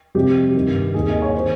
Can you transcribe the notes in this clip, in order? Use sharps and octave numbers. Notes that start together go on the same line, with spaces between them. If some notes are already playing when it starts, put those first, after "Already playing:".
F2 C3 G3 C4 G4
G#1 G2 D#3 G3
D#2 D#3 A#3 G#4
D#5
C#5
D#3 C5